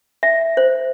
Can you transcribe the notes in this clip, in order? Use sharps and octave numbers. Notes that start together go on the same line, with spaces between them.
E5
C5